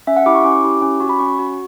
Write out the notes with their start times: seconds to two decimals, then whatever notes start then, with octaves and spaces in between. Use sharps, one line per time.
0.07 C#4 E5
0.17 F#5
0.26 E4 G4 D6
0.35 C#6
0.44 C#4 D6
0.64 E4 G4
0.82 C#4
1.00 F#4
1.09 B5
1.19 C#4 C#6
1.39 F#4